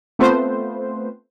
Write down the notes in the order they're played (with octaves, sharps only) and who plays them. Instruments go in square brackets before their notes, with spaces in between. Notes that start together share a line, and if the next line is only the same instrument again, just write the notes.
[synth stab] A3 B3 C4 F4 B4 C5